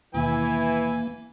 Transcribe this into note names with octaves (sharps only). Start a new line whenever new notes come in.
D#2 B2 E3 A#3 E4 G#5